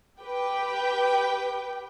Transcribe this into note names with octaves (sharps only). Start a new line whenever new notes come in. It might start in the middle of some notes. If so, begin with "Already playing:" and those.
G4 B4 G5